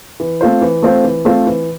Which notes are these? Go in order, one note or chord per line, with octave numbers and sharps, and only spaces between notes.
E3
A3 C4 F4 C5
E3
A3 C4 F4 C5
E3
A3 C4 F4 C5
E3